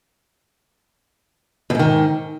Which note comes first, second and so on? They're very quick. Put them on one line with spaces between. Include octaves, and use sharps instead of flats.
F2 G#2 D#3